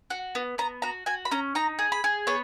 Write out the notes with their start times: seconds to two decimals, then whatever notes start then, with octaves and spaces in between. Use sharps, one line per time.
0.10 F#4 F#5
0.35 B3
0.58 B3 A#5
0.82 F#4 A#5
1.06 F#4 G#5
1.25 B5
1.31 C#4 A#5
1.55 D#4 A#5
1.79 G#4
1.92 B5
2.04 G#4
2.27 B3 C#5